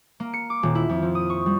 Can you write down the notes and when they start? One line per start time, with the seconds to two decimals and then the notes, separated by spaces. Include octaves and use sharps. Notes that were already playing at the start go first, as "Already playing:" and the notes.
0.20 A#3
0.34 C#7
0.50 D6
0.63 D#1
0.75 E4
0.89 F2
1.02 F3
1.15 D#6
1.30 C#6
1.46 G3